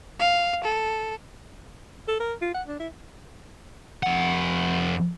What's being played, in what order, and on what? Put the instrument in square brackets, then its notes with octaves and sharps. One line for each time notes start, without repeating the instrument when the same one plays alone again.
[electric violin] F5
A4
[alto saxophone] A4
A#4
F4
F#5
D4
E4
[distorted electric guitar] F2 F#5